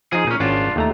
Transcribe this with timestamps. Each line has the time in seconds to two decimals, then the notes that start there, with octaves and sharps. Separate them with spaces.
0.13 F3 D#4 F4 G#4
0.27 A#2 C#4 D#4
0.40 G#1 C#4 D4 F4
0.76 D#2 A3 A#5